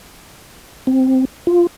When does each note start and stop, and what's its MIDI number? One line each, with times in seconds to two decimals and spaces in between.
0.87 1.25 60
1.47 1.67 65